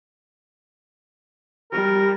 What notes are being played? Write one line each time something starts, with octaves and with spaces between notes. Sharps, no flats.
G3 A#4